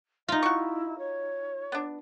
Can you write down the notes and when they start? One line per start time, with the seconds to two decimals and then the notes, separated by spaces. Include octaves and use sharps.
0.28 D#4 F4 E5
0.43 E4 F#4 C#6
0.99 C#5
1.72 B3 D4